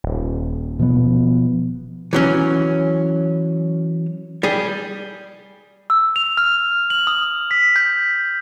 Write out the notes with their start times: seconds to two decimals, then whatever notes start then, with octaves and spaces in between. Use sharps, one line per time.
0.04 D#1
0.79 B2 F3 B3
2.13 E3 F#3 C#4
4.43 G3 G#4
5.90 E6
6.16 F7
6.37 F6
6.90 F#7
7.07 D#6
7.51 B6
7.76 G6